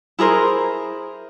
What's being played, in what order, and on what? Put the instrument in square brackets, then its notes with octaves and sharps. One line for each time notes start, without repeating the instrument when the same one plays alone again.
[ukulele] E4 G#4 A#4 C5